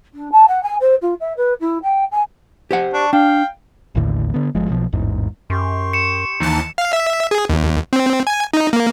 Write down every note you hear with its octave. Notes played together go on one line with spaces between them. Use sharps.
D4
A5
F#5
G#5
C5
F4
E5
B4
E4
G5
G#5
G4 C5 F#5
D4 C#6
D4 F5 G5
A1 D#2 A2 D3
D3 B3
G1 F3 G#3
B1 B2 F3
A1 E2 G#2
F#2 G4 C6 C#6
C#7 E7
D#2 E3 D#4 A5
F5
E5
G#4
D#2
C4
G#5
D#4
A#3